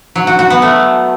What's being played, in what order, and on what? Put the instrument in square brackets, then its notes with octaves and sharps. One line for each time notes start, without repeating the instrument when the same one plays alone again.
[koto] F#3
F#4
F#4
B3
A3